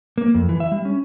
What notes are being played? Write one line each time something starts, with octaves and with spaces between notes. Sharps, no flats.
A#3
F2
E3
E5
G3
C#4